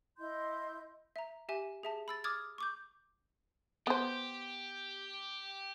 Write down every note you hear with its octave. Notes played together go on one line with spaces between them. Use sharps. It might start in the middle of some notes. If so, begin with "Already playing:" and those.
E4 D#5 C6 G6
E5 A#5
G4 E5 G#5
G#4 E5 A5
B5 E6 A6
D6 D#6 F6 G#6 A6
C#6 D6 G6
B3 G4 C5